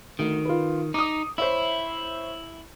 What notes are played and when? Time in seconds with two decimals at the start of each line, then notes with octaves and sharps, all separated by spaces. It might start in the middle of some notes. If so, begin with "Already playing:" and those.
0.19 D2 D#3
0.45 F4 B4
0.94 D#4 D6 D#6
1.38 E4 C5 C#5 E5